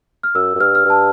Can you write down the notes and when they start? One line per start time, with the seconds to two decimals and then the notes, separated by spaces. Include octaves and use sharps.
0.23 F6
0.35 F#2 E6
0.55 F#2
0.60 G2 F6
0.75 F6
0.85 G2 A5